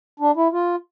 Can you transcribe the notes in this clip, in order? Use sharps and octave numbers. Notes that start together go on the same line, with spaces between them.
D4
E4
F4